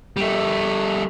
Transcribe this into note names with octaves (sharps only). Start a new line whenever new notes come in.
G3 A3